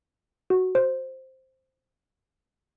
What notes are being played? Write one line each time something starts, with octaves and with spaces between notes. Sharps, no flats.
F#4
C5